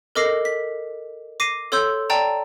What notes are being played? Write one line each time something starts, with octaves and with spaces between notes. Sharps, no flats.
A4 A#4 D#5 D6 A#6 C7
B6
D6 A#6 C7 D#7
A4 C#5 C6 E6 G6
D5 G5 A5 A#5